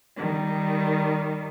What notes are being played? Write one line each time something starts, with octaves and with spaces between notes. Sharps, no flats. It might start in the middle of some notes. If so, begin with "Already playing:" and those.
D#3 G3